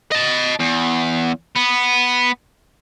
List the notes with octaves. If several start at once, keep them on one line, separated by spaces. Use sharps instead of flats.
D#5 A5
E2
B3